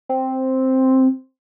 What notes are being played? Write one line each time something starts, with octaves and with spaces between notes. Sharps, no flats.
C4